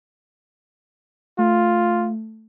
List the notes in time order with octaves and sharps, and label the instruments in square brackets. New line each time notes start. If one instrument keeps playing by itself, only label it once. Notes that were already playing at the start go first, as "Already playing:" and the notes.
[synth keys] A3 [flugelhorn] F4